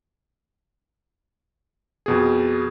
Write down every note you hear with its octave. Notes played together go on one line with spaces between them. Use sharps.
F2 B2 G#4